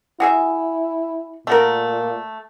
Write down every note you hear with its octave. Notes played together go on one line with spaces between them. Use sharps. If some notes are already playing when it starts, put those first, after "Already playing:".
E4 F#4 G#4 E5
A#2 A3 F#4 A#4